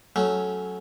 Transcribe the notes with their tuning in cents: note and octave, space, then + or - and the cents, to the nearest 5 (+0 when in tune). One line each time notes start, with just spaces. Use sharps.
F#3 +0 A3 -15 C#4 +0